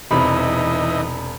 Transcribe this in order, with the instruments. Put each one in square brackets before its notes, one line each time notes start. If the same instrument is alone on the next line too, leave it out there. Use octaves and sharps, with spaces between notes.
[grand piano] E1 C3 B5 [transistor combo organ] E3 D#4